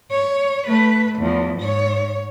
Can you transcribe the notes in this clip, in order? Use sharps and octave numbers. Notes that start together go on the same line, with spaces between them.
C#5
A3 B4
E2 F3
G#2 C#5